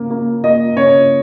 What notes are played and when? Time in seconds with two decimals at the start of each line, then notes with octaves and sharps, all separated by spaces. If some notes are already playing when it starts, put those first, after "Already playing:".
Already playing: C#3 A#3
0.10 A#3
0.44 A#3 D#5
0.76 C#3 C#5